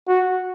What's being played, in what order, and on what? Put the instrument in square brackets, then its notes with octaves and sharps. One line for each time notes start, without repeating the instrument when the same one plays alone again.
[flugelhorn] F#4